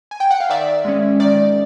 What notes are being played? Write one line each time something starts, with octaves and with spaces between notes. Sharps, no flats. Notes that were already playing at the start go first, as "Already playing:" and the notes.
G#5
G5
F#5
F5
D#3 D5 E5
G#3 C#4
D#3 D5